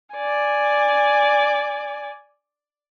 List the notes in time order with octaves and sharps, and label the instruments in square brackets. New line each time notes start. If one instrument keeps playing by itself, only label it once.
[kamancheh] D5 G#5